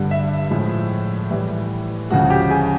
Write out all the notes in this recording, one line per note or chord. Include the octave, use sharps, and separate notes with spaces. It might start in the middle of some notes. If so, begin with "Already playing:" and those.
Already playing: G2 D3 G3
E5
A2 F3 G#3
A2 E3 G3
D2 C#3 F3 G#3 F#4 F#5
G4 G5
G#4 G#5